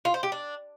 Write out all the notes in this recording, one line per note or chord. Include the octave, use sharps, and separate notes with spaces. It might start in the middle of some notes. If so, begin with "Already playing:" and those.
F4
C5
G4
D4